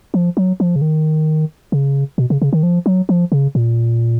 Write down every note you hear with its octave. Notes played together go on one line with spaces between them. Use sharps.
F3
F#3
F3
C#3
D#3
C#3
B2
C#3
C#3
D#3
F3
F#3
F3
C#3
A#2